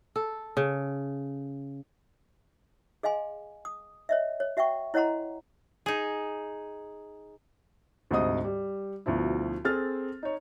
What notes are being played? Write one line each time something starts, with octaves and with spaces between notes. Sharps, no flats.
A4
C#3
G#4 D#5 F5 G#5 C6
D#6
C#5 D#5 E5
C#5
F#4 E5 F#5 G5 C#6
E4 C#5 D#5 F#5 A#5 C6
D#4 G#4
D2 G#2 C3 C5 D#5 D#6
G3
D2 B2 F3 E4
C4 G#4 A4 F6 A6
D#4 C#5